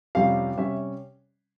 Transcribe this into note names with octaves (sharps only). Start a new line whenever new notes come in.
F2 C3 G3 C#4 F5
C3 G3 C#4 E5